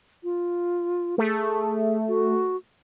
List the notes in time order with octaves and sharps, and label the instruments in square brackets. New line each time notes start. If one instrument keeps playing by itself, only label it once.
[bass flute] F4
[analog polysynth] A3 [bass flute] G#4
[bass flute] F#4